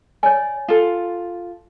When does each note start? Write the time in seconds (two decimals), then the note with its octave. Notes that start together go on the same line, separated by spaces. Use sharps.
0.23 C#5 D5 G#5
0.68 F4 A4